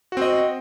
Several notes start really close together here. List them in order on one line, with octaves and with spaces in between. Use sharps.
F#4 C4 D#5